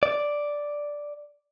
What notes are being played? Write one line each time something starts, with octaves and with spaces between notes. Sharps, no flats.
D5